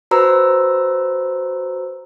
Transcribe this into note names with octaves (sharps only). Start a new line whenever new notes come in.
F#4 B4 C5 A#5 E6